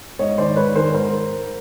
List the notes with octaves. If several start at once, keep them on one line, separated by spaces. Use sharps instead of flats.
G#2 C#5 D#5
D#3 G#3 C5 D5
G#2 B4 C#5
D#3 G#3 A#4 C5
G#2 A#4 C5